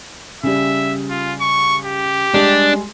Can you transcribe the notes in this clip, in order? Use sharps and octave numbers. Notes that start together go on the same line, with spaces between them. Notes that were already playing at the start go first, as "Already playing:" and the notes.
C#3 G3 E5
F4
C#6
G4
G3 G#3 D4 G#4